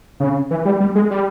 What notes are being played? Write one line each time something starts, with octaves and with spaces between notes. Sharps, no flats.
C#3
E3
G3
G3
G#3
G3